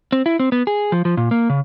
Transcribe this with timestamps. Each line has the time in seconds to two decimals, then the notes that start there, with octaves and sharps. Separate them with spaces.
0.12 C4
0.26 E4
0.40 C4
0.52 B3
0.67 G#4
0.92 F3
1.05 F3
1.17 A#2
1.31 A#3
1.50 C#3